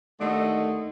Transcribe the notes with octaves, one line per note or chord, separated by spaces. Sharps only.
D#2 D3 A3 D#5